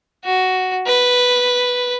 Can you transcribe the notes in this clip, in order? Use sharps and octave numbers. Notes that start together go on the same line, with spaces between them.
F#4
B4